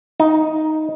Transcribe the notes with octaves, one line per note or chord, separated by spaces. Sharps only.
D#4